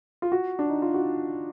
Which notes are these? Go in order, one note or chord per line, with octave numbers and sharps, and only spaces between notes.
F4
F#4
D4
D#4
F4
F#4